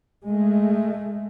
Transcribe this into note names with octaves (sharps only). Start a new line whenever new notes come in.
G#3 A3